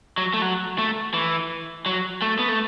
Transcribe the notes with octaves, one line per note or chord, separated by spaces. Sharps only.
F#3
A3
F#3
A3
E3
F#3
A3
B3
A3